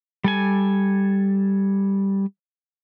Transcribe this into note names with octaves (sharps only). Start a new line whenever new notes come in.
G3 A4 G#5